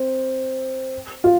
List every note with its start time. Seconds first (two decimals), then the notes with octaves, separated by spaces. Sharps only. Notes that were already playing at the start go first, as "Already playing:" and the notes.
Already playing: C4
1.24 F4